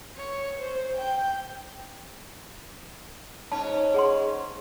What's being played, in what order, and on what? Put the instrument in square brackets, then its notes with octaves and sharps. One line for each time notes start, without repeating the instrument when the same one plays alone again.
[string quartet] C#5
C5
G5
[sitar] G#2 C#4 [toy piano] A5
[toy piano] G#4 F#5 C6